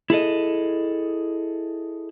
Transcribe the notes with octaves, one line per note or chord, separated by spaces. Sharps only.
E4 G#4 A4 D#5